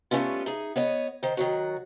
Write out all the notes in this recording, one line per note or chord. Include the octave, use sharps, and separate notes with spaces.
G3 A3 B3 C#4 F4
D#4 G#4
B3 C#5 D#5
D#3 C5
D#3 F#3 F#4